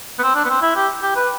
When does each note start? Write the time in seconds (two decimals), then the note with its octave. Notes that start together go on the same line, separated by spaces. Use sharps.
0.19 B3
0.23 C4
0.35 D4
0.45 B3
0.50 C4
0.62 E4
0.76 G4
1.02 G4
1.16 B4